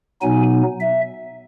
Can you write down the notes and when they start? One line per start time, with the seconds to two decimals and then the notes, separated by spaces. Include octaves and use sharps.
0.21 B2 F#3 B3 D#4 G#5
0.80 E5